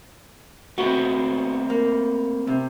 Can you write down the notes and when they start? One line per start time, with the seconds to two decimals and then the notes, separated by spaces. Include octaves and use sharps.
0.78 A3 B3 C4 F#4
1.70 A#3
2.47 C3